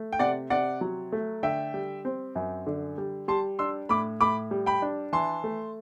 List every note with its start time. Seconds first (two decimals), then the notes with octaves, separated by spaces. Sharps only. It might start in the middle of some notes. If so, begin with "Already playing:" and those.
Already playing: A3
0.12 G5
0.19 C3 D5 F#5
0.50 C3 D5 F#5
0.81 F#3
1.12 A3
1.43 D3 E5 G5
1.74 G3
2.05 C4
2.35 F#2
2.66 D3
2.98 G3
3.28 G3 A5 C6
3.59 D4 C6 E6
3.89 A2 B5 D6
4.21 A2 B5 D6
4.51 G3
4.66 G5 B5
4.82 D4
5.13 E3 A5 C6
5.44 A3